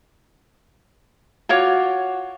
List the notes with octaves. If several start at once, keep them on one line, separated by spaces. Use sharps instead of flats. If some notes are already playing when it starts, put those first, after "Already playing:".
F4 F#4 C#5 D6